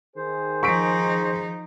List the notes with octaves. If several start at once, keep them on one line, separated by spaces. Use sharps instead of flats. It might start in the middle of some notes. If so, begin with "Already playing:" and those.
D#3 G#4 C5
F3 D#4 C#6 B6 D7